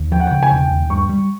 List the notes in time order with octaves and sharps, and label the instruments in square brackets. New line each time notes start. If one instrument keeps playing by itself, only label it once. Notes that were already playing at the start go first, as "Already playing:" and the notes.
Already playing: [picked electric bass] D#2
[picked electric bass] F3 [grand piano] G5
[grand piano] F#5
[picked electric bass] C#3 [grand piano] G5
[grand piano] G#5
[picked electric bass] E1 [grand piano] G5
[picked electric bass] D#2
[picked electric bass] G2 [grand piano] C#6
[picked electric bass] G3